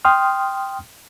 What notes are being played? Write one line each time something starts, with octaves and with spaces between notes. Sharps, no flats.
G5 C6 D#6 F6